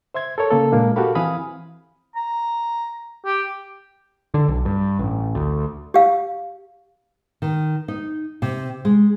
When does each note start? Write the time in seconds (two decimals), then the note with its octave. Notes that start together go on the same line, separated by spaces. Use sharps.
0.14 C5 E5 C6 G#6
0.38 A4 A#4 C#5
0.51 C#3 A#3 A4
0.72 A#2 G#3 A#3 D4
0.96 F#4 G4 A4 A#4 F5 B5
1.15 E3 C4 F5 G#5 B5 D#6
2.15 A#5
3.25 G4
4.34 D3
4.48 B1
4.65 G2
4.99 A1
5.35 D2
5.94 G4 F5
7.42 D#3
7.88 D#4
8.42 C3
8.85 G#3